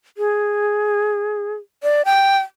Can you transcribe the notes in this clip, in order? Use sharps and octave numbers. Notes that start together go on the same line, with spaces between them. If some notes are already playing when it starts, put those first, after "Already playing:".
G#4
D5
G5